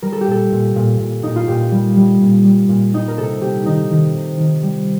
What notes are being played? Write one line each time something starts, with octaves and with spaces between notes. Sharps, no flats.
G3 A#4
A4
G4
A#2 A4
A#2
A#2
A#2
A#2 D#4
F4
A#2 G4
G3
G3
A#2
G3
A#2
G3 D#4
A#4
C3 A4
C3 G4
D#3 D#4
D#3
C3
D#3
G3